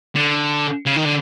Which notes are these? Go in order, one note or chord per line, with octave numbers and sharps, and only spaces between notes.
D3
C#3
D#3
D3